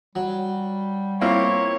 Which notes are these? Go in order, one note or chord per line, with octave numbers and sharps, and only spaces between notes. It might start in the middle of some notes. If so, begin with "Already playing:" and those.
F#3 G3
A#3 C4 E4 F4 C#5